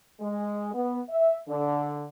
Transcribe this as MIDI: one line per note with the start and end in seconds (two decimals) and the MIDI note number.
0.21 0.72 56
0.74 1.02 59
1.09 1.37 76
1.49 2.05 50